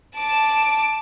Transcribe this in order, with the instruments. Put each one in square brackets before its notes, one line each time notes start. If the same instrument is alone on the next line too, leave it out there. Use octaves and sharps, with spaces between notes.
[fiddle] A5 D6